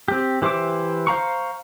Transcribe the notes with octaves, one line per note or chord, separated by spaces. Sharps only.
C4 G4
E3 G4 C5 E5 D6
C5 F5 A#5 C#6